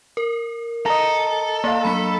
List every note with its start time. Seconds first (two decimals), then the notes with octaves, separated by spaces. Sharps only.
0.17 A#4
0.86 A4 D#5 A#5
1.64 A#3 D5 F5
1.85 F#3 A#3 D4 B5 B6